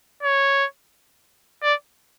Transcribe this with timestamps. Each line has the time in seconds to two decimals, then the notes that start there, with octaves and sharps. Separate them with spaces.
0.23 C#5
1.64 D5